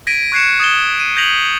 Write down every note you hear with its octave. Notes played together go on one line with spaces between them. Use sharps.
G#6 A#6 B6 D7 D#7
C#6 F#6 G#6 C7 C#7 E7
D#6 G#6 A6 E7 G7
D#7
G6 G#6 A#6 B6 F7 F#7